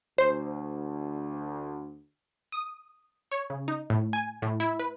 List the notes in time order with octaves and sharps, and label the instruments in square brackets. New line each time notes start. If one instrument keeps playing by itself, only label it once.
[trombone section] D2 [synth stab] C5
[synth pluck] D#6
C#5
C#3
D#4
A2
G#5
A2
E4
B4